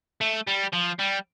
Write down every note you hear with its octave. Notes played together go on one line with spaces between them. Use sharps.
A3
G3
F3
G3